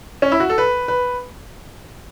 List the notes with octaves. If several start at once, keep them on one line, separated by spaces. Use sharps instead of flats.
C#4
E4
F#4
A4
B4
B4